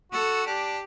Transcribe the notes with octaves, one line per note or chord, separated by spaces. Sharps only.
F#4 A4
D4 G4